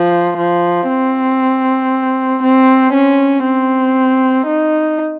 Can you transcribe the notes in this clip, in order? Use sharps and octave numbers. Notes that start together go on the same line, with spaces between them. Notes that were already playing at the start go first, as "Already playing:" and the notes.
Already playing: F3
F3
C4
C4
C#4
C4
D#4